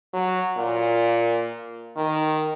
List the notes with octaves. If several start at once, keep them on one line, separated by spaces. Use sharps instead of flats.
F#3
A#2
D#3